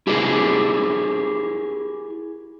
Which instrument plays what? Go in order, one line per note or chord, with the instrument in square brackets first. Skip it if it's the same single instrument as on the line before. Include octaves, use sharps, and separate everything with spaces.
[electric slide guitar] E4 G4 G#4 A#4 D5